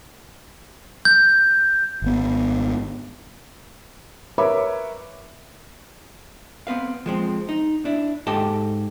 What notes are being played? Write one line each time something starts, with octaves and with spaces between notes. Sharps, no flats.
G6
G#1 B3
A#4 B4 C#5 E5 B5 D6
B3 C4 B4 F5
F3 G#3 C4
D#4
D4 E4
G#2 G4 A4 D#5 G5 A5